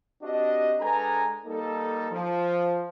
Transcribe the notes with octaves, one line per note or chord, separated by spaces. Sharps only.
C4 D4 F#4 G4 D#5
G#3 D4 A4 B4 G#5 A#5
G3 A#3 D#4 A4
F3